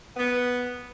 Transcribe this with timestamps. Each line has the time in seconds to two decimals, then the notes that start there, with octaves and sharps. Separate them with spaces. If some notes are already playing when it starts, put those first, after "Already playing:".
0.16 B3